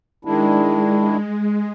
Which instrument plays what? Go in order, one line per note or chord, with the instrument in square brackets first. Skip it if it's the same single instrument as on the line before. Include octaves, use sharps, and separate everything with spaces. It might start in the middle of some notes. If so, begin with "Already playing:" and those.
[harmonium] D#3 D4 E4 [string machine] G#3